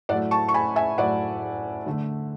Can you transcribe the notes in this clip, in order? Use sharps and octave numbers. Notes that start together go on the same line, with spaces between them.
A2 F#3 A3 D5 F#5
A5 C#6
C#6
G#5 B5
E5 G#5
A2 F#3 A3 D5 F#5
D3 A3